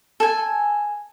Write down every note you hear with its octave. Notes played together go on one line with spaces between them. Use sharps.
A4 G#5